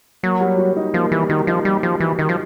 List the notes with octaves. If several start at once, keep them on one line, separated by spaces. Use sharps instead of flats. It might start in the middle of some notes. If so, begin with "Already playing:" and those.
F#3 A#3
G3
F#4
D#4
F3 A#3
E3 G3
D#3 F#4
F3 D#4
G3 A#3
F3 G3
E3 F#4
D#3 D#4
F3